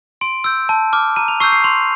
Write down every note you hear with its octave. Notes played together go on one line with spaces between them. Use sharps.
C6 D7
E6 G6
A5
D6 F6
A#5 D#7
F7
C#6 E6 G6 C7
C7
C6 F7